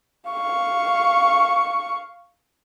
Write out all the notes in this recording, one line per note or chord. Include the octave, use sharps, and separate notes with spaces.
F5 C#6